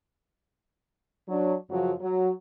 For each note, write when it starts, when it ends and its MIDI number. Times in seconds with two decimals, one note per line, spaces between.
1.29 1.54 54
1.29 1.54 62
1.70 1.92 42
1.70 1.92 49
1.70 1.92 53
1.70 1.92 54
2.00 2.29 54